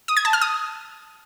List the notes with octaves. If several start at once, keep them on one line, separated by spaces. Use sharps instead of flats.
D#6
G#6
A5
F6
D#6